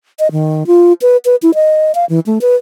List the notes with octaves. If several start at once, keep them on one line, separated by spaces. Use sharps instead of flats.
D#5
D#3
F4
B4
B4
E4
D#5
F5
E3
A3
B4